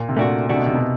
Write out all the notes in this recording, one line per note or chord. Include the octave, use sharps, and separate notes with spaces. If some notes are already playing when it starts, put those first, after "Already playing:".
Already playing: A#2
C3
A#2 A3 D4 F#4
C3 A3 D4 F#4
B2
C3
B2